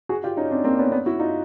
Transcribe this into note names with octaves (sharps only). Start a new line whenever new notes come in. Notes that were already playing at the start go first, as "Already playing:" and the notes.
F#4 G#4
F4 G4
C#4 D#4
C4 D4
A#3 C4
B3 C#4
B3 C#4
E4 F#4
D#4 F4